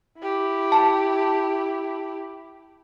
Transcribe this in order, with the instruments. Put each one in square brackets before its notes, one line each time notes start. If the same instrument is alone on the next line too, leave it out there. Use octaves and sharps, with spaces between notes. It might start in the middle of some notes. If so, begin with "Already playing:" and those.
[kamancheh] E4 G4
[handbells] A5